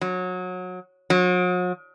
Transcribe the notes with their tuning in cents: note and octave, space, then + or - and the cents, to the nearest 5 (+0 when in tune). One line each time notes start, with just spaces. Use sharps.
F#3 -25
F#3 -45